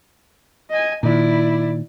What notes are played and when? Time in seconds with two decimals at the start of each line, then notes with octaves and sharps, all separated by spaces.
0.70 D#5 G#5
1.03 A#2 D#3 E4 D5